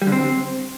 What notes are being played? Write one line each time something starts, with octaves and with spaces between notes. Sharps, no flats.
G3
D3
C4